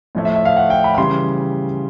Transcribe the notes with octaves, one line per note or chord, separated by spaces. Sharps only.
A2 F3 A3
E5
E5
F5
F#5
G5
B5
B5
C#3 E3 G3 C6